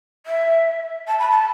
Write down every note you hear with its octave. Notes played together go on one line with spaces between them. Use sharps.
E5
A5
B5
A5